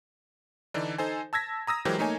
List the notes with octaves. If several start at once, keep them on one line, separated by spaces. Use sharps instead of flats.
D3 E3 D4 D#4
D#4 A4 C5 G#5
A5 E6 G#6 A#6 B6
A#5 D#6 E6 A#6
E3 F#3 G#3 G4 A#4 C5
A3 A#3 D#4 C#5 G#5